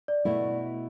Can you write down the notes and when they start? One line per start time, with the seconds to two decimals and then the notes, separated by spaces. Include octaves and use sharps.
0.08 D5
0.25 B2 A3 E4